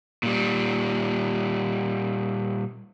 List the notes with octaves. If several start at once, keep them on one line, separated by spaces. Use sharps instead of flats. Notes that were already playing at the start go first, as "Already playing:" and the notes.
A#2 G3